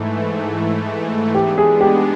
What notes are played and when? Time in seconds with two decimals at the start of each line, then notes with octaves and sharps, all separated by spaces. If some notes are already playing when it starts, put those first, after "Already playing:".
Already playing: G#2 E3 A3
1.35 G#3 B3 D4 G4
1.58 G#4
1.81 G4